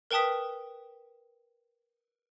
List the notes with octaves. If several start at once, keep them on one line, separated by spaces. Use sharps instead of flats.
A#4 B4 G5 A5 D#6 B6